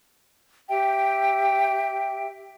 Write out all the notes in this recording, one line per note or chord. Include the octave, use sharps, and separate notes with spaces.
G4 E5 G5